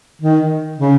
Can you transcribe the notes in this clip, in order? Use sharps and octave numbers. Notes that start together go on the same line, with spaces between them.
D#3
C#3